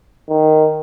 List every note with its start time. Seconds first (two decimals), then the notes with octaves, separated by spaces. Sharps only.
0.30 D#3